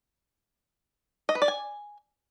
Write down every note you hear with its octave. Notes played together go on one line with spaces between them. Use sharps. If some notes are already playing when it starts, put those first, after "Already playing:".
D#5
B4
D5
G#5